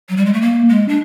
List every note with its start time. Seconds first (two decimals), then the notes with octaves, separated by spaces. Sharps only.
0.09 F#3
0.17 G3
0.26 G#3
0.33 A3
0.42 A#3
0.69 G#3
0.88 D4